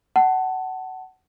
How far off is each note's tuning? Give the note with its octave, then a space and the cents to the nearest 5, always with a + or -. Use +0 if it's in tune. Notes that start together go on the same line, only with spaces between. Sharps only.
F#5 +20 A5 +5